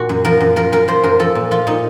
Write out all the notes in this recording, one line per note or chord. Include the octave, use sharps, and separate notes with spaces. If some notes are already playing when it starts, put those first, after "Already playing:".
Already playing: A#2 F#4
F#2
F3 A#4
F#2
F3 A#4
F#2 A#4
F3 C5
F#2 A#4
F3 A4
A#2
F3 F4
A#2 D#4